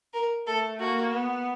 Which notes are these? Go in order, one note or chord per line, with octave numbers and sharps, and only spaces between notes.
A#4
A3 A4
A#3 F#4
B3